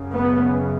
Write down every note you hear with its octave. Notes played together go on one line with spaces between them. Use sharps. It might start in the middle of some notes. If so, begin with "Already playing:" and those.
Already playing: F#2 C#3
B3